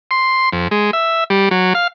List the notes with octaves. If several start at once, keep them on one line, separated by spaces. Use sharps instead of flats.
C6
F2
G#3
E5
G3
F#3
F5